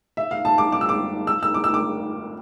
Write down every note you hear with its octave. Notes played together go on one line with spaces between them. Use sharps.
E5
F5
A5
D6
D6
E6
D6
E6
E6
D6
E6
D6